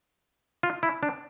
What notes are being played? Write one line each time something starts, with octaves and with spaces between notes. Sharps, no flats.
F4
E4
D4